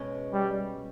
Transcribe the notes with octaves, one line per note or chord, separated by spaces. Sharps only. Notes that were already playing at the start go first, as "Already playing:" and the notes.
Already playing: B2 G#3 C#4
G3